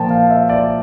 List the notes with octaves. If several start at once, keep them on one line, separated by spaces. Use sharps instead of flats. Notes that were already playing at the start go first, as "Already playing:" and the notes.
Already playing: A#2 F3 A#3 G5 A5
F5
E5
D5